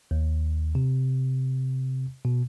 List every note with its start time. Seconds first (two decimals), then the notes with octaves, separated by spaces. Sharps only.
0.11 D#2
0.75 C3
2.25 B2